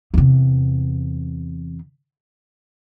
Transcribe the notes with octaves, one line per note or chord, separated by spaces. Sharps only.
E2 C3